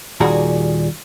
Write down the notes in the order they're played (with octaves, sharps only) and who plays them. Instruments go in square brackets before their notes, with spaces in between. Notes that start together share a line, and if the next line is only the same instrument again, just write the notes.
[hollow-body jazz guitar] D#2 A#2 G3 F#4 G#4 A#5